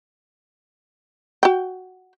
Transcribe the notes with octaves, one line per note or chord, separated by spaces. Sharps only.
F#4 G5